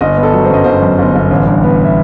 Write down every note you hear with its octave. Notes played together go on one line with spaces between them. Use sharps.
G1 D#5
B3
A4
F#3
C5
F#2 D#5
G1 C5
F#2
G1
G1
A1
G2
B3
E5